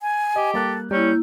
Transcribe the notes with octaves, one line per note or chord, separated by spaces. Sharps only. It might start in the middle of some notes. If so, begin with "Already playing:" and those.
G#5
G4 D#5
G3 A#3 A4 F#6
G3 A#3 C#4 E4 G6